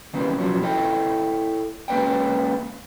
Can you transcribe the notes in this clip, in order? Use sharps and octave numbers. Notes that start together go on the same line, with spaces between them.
D#3 E3 G3 A#3 B3 C#4
B2 F3 F#3 C#4
E4 A4 D#5 G5
G#3 A#3 C#4 B4 D5 G5